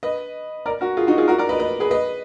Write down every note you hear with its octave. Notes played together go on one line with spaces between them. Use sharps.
B4 D#5
A#4 D5
F#4 A#4
F4 G#4
D#4 F#4
F4 G#4
F#4 A#4
A#4 D5
B4 D#5
B4 D#5
G#4 B4
B4 D#5